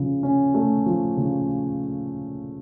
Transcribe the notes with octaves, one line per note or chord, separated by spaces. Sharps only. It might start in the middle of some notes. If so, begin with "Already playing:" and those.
Already playing: C#3 F3
C#4
A3
F3
C#3